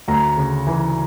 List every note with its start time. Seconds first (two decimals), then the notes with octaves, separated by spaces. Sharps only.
0.08 D2 A#5
0.37 C#3
0.67 E3